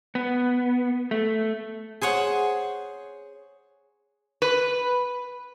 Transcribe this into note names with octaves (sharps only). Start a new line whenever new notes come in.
B3
A3
G#4 C5 C#5 F#5
B4